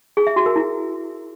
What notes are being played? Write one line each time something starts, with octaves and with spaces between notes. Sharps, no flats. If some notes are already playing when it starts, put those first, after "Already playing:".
G#4
E5
F#4
A#4
E4